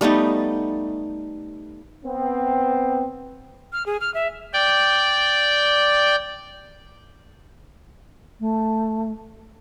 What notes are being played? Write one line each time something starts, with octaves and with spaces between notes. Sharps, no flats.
G3 A3 B3 D#4
B3 C4
F6
G#4
F6
E5
D5 G5
A3